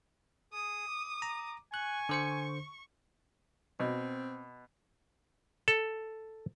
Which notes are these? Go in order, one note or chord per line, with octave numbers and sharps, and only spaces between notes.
G#4 D#6
D6
A#5
G#5 C#6 F#6
D3 C5 C#7
B2 C4
A4